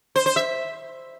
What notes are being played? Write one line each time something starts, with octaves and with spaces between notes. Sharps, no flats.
C5
C5
E5